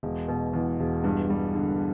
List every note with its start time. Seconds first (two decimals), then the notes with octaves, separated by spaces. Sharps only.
0.03 E1
0.28 B2
0.53 E2
0.80 E1
1.04 G2
1.30 G3
1.55 D3